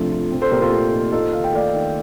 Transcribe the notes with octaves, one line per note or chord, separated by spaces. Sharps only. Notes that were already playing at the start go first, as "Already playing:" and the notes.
Already playing: C3 F3 A3 D4 F4 A4
F4
C4
A4 C5
A#2 G4 A#4
F4 A4
A3
D#4
D#4 F4 A4
D#3 F5
G5
A3 D5 F5
D#3